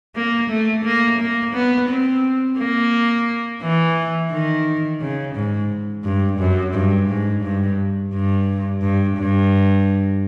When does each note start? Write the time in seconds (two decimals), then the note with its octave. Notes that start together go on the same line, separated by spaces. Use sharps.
0.15 A#3
0.49 A3
0.84 A#3
1.19 A#3
1.53 B3
1.88 C4
2.58 A#3
3.62 E3
4.31 D#3
5.01 C#3
5.35 G#2
6.04 G2
6.39 F#2
6.74 G2
7.08 G#2
7.43 G2
8.13 G2
8.82 G2
9.17 G2